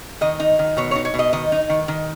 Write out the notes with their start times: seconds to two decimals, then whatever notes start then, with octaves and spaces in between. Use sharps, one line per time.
0.21 D#3 D#5
0.40 D#4
0.59 D#3
0.77 B2 C#5
0.91 D#4 C#5
1.05 C#5
1.14 B2
1.19 D#5
1.33 D#3 D#5
1.52 D#4
1.69 D#3
1.88 D#3